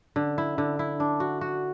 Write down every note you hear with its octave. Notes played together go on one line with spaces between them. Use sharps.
D3
E4
D3
E4
D4
F#4
F#4